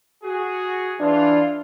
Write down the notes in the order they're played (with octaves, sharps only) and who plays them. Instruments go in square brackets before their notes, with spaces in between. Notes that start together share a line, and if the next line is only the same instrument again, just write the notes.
[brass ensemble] F#4 G#4
[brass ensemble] E3 F4 [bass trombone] D4